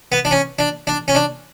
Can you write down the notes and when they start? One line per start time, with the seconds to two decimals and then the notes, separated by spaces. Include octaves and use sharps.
0.12 B3
0.25 D4
0.31 C#4
0.59 D4
0.87 D4
1.08 C#4
1.15 D4